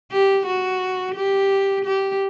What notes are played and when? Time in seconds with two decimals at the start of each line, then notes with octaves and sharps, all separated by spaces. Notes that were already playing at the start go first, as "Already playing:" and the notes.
0.11 G4
0.46 F#4
1.15 G4
1.85 G4